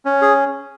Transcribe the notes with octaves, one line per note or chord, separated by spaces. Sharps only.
C#4
G#4